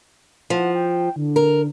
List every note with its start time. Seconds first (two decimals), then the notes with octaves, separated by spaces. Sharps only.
0.50 F3 F#5
0.75 G5
1.16 D3
1.36 A#4